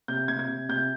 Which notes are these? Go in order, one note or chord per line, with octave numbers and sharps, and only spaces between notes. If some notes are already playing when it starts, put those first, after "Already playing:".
C3 G6
C3 G#6
G#6
C3
C3 G6